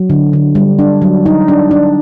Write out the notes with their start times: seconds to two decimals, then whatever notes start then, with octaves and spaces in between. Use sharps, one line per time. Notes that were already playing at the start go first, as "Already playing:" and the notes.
Already playing: F#3
0.10 D3
0.33 D3
0.55 G3
0.79 D4
1.02 F#3
1.26 D#4
1.48 D4
1.71 D4